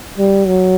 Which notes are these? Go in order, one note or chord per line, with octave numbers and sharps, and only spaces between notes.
G3
F#3